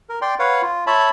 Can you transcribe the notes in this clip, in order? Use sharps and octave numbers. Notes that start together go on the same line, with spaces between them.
A#4
D5 G5 C6
B4 C#5 F5 F#5
F4
C#5 E5 A5 B5